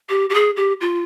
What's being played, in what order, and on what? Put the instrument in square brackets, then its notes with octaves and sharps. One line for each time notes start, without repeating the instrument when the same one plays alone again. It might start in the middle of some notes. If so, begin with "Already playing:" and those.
[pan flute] G4
G4
G#4
G4
F4